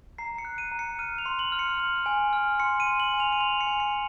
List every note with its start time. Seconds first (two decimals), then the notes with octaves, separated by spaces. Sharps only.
0.18 A#5 C7
0.38 C#7
0.45 F#6
0.58 D#7
0.72 A#5
0.79 C#7
0.99 F6 D#7
1.18 F7
1.26 C6
1.39 F#7
1.52 F6
1.59 C#7
1.79 F6
2.06 G#5
2.33 F6
2.60 C6 C#7
2.80 D#7
2.87 C6
3.00 F#7
3.14 G#5
3.20 F7
3.32 D#7
3.40 C6 F7
3.61 C#7
3.67 G#5
3.80 C#7